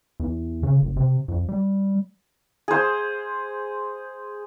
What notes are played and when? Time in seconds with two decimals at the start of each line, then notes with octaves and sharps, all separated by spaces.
0.20 E2
0.63 C#3
0.82 F#1
0.97 C3
1.28 F2
1.49 G3
2.68 G#4 C5